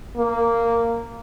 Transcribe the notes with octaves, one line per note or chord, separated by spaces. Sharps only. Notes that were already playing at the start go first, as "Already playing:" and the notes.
A#3